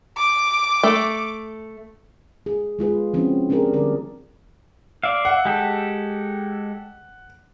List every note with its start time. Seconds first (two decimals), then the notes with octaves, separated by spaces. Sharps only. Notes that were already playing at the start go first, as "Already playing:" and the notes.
0.17 D6
0.83 A3
2.46 G#4
2.79 G#3 F4 G#4 B4
3.14 F3 C4 C#4 E4 F#4
3.49 A#3 C4 D4 G4 G#4 A#4
3.73 D3 G3 A#4 D5
5.04 D5 E5 F5
5.25 F#5
5.45 G#3 G4 A4